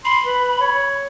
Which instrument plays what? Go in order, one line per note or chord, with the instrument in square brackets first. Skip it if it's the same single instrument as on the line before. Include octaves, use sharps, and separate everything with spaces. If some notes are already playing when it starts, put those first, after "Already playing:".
[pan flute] B5 [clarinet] C6
[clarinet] B4
C#5